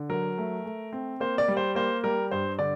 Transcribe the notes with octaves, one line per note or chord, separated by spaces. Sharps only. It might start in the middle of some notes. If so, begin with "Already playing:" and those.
Already playing: D3
F#3 A#4
A3
A3
C4
A#3 C5
D5
G3
C5
A#3 C5
G3 A#4
G2 C5
D3 D5